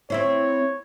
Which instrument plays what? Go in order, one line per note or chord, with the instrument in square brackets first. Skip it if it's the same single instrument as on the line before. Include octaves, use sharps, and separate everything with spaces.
[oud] C4 E4 C5 [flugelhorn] C#5